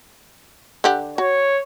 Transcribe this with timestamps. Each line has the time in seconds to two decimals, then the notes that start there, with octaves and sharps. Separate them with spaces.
0.84 D3 G4 F#5
1.18 F#4 C#5